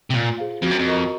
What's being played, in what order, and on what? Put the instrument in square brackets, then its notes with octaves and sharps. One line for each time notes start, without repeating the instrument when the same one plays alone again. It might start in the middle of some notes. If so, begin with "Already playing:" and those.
[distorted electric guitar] C3
[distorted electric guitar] A#2 [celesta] F4
[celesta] G#4 C5 F5
[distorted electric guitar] F2 [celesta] F#4
[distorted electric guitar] F#2
F2
[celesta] A#4 D#5 A#5 C#6